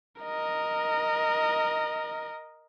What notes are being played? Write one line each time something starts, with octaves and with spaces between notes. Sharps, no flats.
A#4 D#5